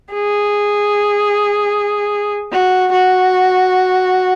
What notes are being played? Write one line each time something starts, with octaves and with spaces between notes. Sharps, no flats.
G#4
F#4
F#4